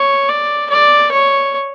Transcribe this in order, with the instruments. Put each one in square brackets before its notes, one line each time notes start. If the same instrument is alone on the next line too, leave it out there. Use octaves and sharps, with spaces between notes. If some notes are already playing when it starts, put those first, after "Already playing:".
Already playing: [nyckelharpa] C#5
D5
D5
C#5